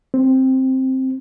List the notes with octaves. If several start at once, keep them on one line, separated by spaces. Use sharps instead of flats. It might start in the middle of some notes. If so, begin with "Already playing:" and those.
C4